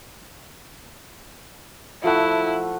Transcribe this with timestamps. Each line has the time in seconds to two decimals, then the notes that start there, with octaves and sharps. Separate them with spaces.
2.04 F3 A3 E4 F#5